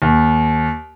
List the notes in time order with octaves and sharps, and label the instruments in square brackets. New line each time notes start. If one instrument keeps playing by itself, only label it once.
[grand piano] D#2